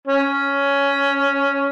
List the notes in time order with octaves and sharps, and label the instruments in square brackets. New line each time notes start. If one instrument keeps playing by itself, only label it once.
[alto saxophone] C#4